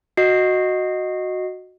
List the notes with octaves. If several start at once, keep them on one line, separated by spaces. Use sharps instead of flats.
F#4 D#5 C7